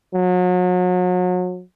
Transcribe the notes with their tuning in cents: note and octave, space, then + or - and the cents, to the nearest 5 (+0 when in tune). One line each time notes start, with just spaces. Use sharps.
F#3 -35